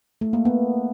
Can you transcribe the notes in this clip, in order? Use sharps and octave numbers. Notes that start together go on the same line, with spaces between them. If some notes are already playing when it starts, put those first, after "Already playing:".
A3
A#3
B3